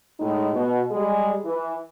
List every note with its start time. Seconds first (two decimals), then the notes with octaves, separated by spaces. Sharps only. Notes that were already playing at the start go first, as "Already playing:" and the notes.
0.20 A2 G#3 D#4
0.54 B2
0.91 G3 G#3 G#4
1.45 E3